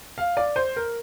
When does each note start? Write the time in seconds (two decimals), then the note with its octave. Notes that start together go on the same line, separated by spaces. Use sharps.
0.18 F5
0.37 D5
0.56 C5
0.76 A#4